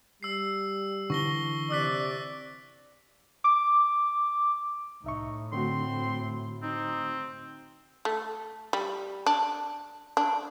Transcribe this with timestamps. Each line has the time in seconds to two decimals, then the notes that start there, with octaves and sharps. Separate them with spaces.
0.23 G3 E6 C7
1.10 D3 E3 D4 C#6 A#6 G7
1.71 C3 D5 E6 F#6 B6
3.44 D6
5.04 C2 A2 D#4 E5 C#6
5.53 D3 A3 C4 F#4 C6
6.62 C4 D#4
8.05 A3
8.73 G3
9.26 D4
10.17 D4